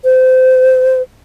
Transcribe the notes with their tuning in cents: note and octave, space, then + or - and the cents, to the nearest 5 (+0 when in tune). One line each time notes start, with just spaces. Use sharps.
C5 -25